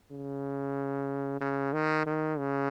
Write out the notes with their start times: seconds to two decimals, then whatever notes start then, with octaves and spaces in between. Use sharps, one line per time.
0.11 C#3
1.40 C#3
1.73 D#3
2.06 D#3
2.38 C#3